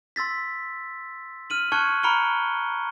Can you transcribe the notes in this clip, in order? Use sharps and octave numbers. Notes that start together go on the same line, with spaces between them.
C6 E6 A6 B6
F6 D#7 F#7
A5 C#6 F6 F#6 G#6 C#7
A#5 B5 F6 C#7 D7 G7